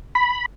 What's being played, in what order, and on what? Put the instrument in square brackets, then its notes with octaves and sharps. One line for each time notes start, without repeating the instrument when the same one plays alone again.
[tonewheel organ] B5